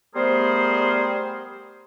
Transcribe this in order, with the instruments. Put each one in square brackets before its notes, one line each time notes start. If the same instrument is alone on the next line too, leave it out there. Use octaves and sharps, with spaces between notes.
[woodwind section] G3 A3 B3 G#4 A#4 C5